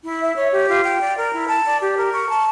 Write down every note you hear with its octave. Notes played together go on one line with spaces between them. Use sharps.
E4
E5
C#5
G4
F4
G5
D5
A#4
E4
A5
D5
G4
A#4
C#6
A5